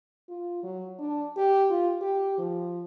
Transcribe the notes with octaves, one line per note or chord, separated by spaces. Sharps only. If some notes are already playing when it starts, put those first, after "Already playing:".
F4
F#3
D4
G4
F4
G4
F3